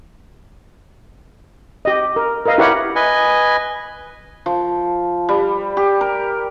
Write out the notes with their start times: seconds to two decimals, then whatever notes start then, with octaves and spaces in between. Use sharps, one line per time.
1.85 G4 D#5
2.16 A#4
2.45 A#4 B4 D#5 F5
2.58 E4 G4 A#4 B4 C#5 F#5
2.96 B4 D#5 G#5
4.46 F3
5.29 G3
5.77 G4
6.01 A#4